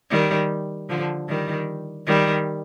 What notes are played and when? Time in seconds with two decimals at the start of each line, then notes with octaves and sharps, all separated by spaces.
0.10 D#3 G3
0.89 D3 F3
1.29 D#3 G3
2.06 D#3 G3